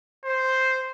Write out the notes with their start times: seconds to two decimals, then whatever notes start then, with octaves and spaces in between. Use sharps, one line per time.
0.25 C5